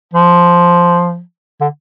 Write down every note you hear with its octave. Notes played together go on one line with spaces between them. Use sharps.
F3
D3